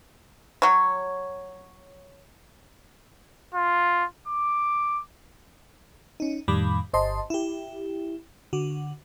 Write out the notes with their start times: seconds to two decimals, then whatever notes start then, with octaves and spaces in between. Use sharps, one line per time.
0.62 F#3 C#5
3.54 F4
4.28 D6
6.20 C#4 D#4
6.48 F2 A2 D#3 G3 B5 D6
6.93 G1 C5 D#5 A5 C6
7.30 E4 G4
8.53 D3 F#4